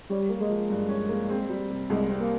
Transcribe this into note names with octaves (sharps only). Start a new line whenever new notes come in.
G3 C#4
A#3
G#3
F3
G2
C#4
A#3
C4
G3
C3
C2 G#3
C4
A#3